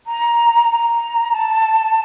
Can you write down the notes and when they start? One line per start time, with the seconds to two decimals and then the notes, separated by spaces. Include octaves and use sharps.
0.07 A#5
0.72 A#5
1.34 A5